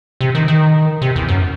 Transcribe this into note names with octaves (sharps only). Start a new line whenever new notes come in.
C3
D#3
D#3
C3
E2
F#2